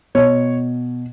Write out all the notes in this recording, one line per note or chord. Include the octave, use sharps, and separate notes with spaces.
B2 C#5